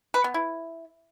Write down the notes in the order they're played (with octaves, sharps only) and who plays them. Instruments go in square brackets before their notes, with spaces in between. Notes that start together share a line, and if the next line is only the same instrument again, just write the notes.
[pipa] B4
B3
E4